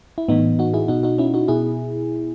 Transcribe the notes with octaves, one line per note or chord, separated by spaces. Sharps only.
E4
A2 E3 B3 D#4
D#4 F#4
E4 G#4
B2 D#4 F#4
D#4 F#4
C#4 E4
D#4 F#4
B2 E4 G#4